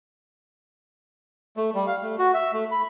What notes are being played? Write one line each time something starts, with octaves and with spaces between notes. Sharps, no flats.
A3
G3
F5
A3
F#4
E5
A3
B5